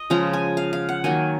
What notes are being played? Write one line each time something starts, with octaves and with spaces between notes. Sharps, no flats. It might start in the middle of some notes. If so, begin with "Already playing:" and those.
Already playing: D#5
C#3 F3 G#3 A#5
G#5
F5
F5
F#5
D#3 F#3 A#3 G#5